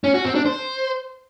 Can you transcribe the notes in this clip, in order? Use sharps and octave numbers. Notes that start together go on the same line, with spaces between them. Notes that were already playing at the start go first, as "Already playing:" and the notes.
C#4
F#4
C4
D4
C5